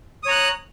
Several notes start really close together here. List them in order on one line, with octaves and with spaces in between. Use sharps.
D#6 C#5 A#5 F#6